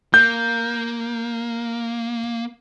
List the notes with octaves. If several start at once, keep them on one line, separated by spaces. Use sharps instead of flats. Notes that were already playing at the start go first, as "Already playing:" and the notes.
A#3 G6